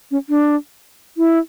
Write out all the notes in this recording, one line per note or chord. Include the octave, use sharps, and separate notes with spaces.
C#4
D4
E4